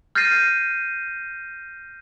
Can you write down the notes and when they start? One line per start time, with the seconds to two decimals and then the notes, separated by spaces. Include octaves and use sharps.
0.15 F6 G6 A6 A#6 C7 D#7